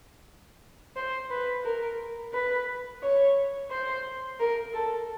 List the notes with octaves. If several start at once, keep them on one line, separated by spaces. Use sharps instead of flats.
C5
B4
A#4
B4
C#5
C5
A#4
A4